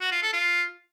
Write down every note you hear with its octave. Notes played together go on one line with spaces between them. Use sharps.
F#4
F4
A4
F4